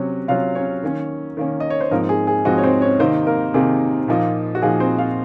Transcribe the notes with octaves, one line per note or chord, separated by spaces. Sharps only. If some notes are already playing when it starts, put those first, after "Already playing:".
Already playing: C3 F#3 C#4
C3 F#3 C#4 F4 F5
C#4 C#5
D#3 A#3 C#4
D#3 A#3 C#4
D#5
C#5
C5
G#2 F3 A#3 C4 D#4 A#4
G#4
G#4
G#2 F3 C4 D#4 F#4
C#5
C4 C5
C#4 C#5
C3 D#3 A#3 C4 D#4 C5
A#3 A#4
C3 D#3 A#3 D#4 G#4
A#2 F3 A#3 D#4
F#4
A#2 F3 A#3 D#4 G#4
C4 C5
F4 F5